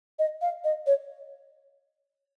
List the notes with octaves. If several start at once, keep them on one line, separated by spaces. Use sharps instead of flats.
D#5
F5
D#5
C#5